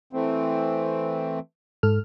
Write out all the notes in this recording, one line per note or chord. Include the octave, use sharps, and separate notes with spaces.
E3 A3 C4
G#2 A4 F6